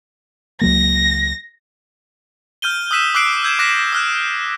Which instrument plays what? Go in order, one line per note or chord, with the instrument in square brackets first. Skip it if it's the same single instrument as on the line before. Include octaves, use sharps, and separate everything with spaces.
[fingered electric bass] C#2 F#3 A#3 [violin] A#6
[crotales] F6 G6 D#7 G7
D#6 E6 F#6 B6 D#7 E7
D6 E6 F#6 C7 D7
E6 G6 G#6 E7
D6 F#6 A#6 B6 E7
D#6 F6 F#6